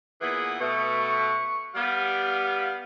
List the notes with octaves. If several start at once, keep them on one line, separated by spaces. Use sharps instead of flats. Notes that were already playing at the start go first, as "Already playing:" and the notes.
A#2 E3 B3 G#4
B2 A3 C#6
G3 B3 F5